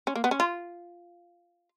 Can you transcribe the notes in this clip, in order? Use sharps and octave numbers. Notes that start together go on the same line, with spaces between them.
C#4
A#3
B3
C#4
F4